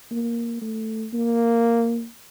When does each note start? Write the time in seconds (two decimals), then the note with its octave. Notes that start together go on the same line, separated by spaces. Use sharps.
0.11 A#3
0.62 A3
1.13 A#3